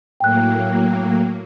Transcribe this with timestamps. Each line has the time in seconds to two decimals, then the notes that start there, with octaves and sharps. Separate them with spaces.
0.20 A2 F#3 A#3 G5 F#6